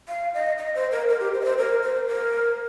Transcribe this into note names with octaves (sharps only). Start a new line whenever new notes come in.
F5
D#5
D#5
C5
A#4
A#4
G4
C5
D#5
C5
A#4
C5
A#4